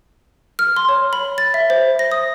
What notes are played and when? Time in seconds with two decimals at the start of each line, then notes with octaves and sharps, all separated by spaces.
0.59 F6
0.76 C6
0.89 C#5
1.13 B5
1.38 A6
1.54 E5
1.70 C5
1.99 A#6
2.12 D#6